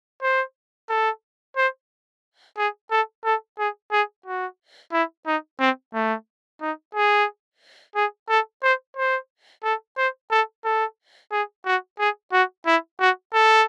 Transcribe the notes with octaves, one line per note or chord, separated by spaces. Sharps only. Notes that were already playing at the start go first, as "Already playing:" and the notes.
C5
A4
C5
G#4
A4
A4
G#4
G#4
F#4
E4
D#4
C4
A3
D#4
G#4
G#4
A4
C5
C5
A4
C5
A4
A4
G#4
F#4
G#4
F#4
E4
F#4
A4